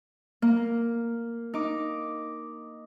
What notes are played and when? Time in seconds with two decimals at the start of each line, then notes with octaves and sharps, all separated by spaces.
0.42 A#3
1.54 D#4 D6